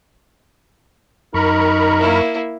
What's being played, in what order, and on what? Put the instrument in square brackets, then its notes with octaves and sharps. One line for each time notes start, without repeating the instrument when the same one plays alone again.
[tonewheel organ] F#2 C#6 [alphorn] D#4 [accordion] A#4 A#5 B5
[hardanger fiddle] A#3 E4